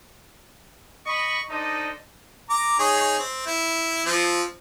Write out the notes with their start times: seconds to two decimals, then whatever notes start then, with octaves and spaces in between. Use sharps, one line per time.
1.07 D#5 B5 C#6
1.50 D4 D#4 A4 C5 D5 D#5
2.50 A#5 D6
2.79 D#4 G#4 C#5
3.18 C4
3.47 E4
4.06 F3 C4